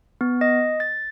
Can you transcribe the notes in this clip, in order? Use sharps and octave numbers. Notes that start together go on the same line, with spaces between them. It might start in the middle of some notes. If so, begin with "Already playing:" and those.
B3
D#5
A6